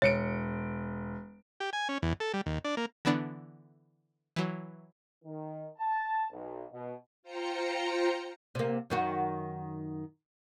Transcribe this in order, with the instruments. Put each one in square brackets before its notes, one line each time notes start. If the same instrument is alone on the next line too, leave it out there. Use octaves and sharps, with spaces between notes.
[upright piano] E1 C#7 D7 [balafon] C#5
[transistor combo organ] G4
G#5
C#4
E2
A4
G3
D#2
D4
A#3
[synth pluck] D3 E3 B3 D4
E3 F#3
[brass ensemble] D#3
A5
B1
B2
[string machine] F4 C5 G5 A#5 C#7
[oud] C3 A#3
F#2 D#3 F#4